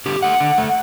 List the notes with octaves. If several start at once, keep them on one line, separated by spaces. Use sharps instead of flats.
D3 G4
A3 F#5
D3
A3